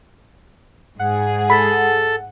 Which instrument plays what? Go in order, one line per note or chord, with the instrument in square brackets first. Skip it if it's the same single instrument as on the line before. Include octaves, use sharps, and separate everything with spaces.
[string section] G#2 G#4 [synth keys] F#5
[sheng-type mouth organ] A4 [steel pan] B5